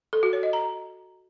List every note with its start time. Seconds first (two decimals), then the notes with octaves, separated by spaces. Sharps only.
0.13 A4
0.23 F#4
0.33 C#5
0.43 D#5
0.53 A#5